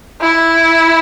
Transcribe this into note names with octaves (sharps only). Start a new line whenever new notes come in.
E4